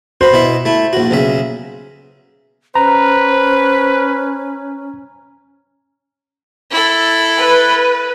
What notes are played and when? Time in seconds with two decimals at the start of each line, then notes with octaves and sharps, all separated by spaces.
0.21 F#4 B4 C5
0.33 B2 E4 E5
0.65 A3 E4
0.93 A#1 F#4
1.11 B1 C#3 E5
2.75 C#4 B4 C5 A#5
6.71 E4 A4
7.38 B4